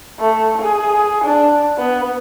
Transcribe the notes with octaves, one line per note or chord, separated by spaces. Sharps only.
A3
G#4
D4
B3